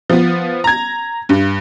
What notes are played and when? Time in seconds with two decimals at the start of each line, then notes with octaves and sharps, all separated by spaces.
0.10 F3 B3
0.64 A#5 G#6
1.29 G2